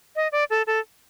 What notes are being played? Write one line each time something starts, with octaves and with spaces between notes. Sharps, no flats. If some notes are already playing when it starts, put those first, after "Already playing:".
D#5
D5
A4
A4